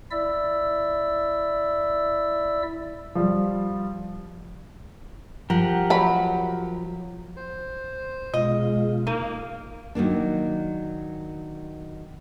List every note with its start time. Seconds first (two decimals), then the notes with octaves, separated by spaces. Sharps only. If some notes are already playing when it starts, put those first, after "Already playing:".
0.11 E4 D5 E5 E6
3.15 F3 G3
5.50 F3 G4 A#4 F#5
5.90 F#3 B5
7.37 C5
8.34 B2 G#3 F4 D#5
9.07 A#3 D#4
9.95 D#3 F#3 A#3 D4